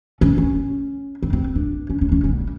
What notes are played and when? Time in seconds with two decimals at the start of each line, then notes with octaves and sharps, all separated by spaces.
0.21 C#4
0.38 C#4
1.23 C4
1.33 C4
1.55 D4
1.90 C#4
2.01 C#4
2.12 C#4
2.24 C#4
2.35 G3